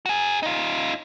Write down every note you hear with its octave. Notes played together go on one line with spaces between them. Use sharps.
F#4 G#4
D#4 F4